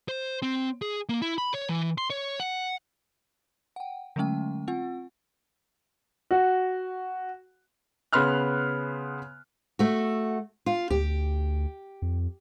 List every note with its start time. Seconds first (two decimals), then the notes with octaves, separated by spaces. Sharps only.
0.09 C5
0.42 C4
0.82 G#4
1.09 A#3
1.22 E4
1.38 B5
1.54 C#5
1.69 E3
1.98 C6
2.10 C#5
2.40 F#5
3.76 F#5 G5
4.16 D3 F#3 G#3 A3 C#4 G5
4.68 C4 F4 F#5
6.31 F#4
8.13 C#3 B3 B5 C6 F6 F#6
9.79 A3 F#4
10.66 F4
10.90 D2 G4
12.02 F2